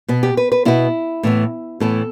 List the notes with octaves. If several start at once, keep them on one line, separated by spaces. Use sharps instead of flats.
B2 B3
G4
B4
B4
B2 B3 E4
A2 E3 B3
A2 E3 B3 A4